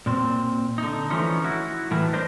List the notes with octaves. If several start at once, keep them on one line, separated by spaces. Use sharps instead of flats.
A#2 C4
D3 D#4
E3 F3 A3 C#4 D#4
E4 F#4
A2 E3 A3 E4 A#4
D4 C5 D#5